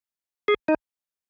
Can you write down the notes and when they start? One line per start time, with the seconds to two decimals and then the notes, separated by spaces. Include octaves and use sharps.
0.48 G#4
0.68 D#4